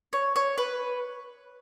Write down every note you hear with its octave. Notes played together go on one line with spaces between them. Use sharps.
C#5
C#5
B4